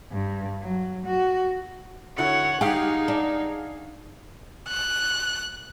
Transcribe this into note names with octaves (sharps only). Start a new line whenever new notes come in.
G2
F#3
F#4
D3 E4 F#4 C#5 F#5
D#4 G4 G#4 F5 F#5
D4
F#6